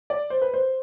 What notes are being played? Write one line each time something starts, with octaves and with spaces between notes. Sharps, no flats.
D5
C5
B4
C5